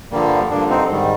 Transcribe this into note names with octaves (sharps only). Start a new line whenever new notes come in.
G2 D3 F3 G3 A#3
G2 D3 F3 A#3 D4
C4 D#4
G#2 D#3 G3